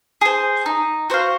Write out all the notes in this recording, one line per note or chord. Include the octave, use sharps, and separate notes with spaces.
G#4 C5
D#4
F#4 C5 F5